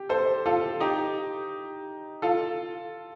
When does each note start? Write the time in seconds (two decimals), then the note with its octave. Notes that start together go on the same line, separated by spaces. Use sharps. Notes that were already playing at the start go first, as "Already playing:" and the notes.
Already playing: G4
0.09 A4 C5
0.46 F4 A4
0.80 D#4 G4
2.22 F4 A4